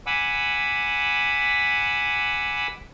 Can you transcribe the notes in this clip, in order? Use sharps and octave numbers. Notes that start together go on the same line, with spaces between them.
F#5 G#5 B5 D6 E6